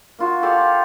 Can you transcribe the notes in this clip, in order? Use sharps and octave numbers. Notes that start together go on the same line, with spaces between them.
A#3 F4 F#4
G4 A4 D5 F5
F4